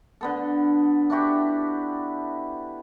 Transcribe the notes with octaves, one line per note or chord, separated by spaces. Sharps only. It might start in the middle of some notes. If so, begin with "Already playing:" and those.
D3 B3 A4
D4 E4 F#4 G4